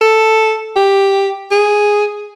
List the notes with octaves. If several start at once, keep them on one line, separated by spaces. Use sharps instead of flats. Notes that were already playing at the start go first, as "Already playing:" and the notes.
A4
G4
G#4